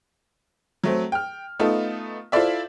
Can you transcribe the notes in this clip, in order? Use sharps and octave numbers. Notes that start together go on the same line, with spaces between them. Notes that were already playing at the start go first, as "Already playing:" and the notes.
F#3 A3 C4
G5 F6
A3 B3 D#4 F4 A4
E4 F4 A4 C5 D5 E5